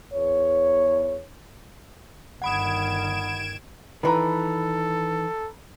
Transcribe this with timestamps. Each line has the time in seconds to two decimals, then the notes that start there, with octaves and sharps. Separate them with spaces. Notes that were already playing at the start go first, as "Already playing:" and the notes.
0.14 E2 C#5
2.42 G1 D#3 F#5 B5 D#6 G#6 D7 E7
4.03 D#3 E3 A4 B4 A#5